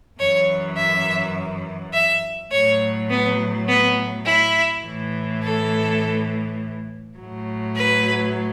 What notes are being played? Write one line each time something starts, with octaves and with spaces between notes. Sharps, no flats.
F#2 E3 C#5
E5
E5
A2 F#3 C#5
B3
B3
E4
A2 E3
A4
A2 F#3
B4